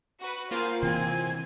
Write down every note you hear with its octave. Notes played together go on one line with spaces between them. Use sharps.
F#4 B4
A#3 F4 G#4 C5 F5
C3 E3 C4 G#5